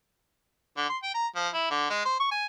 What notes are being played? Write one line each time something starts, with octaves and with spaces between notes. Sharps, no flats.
D3
C6
G5
A#5
F3
E4
D3
G#3
C5
C#6
G#5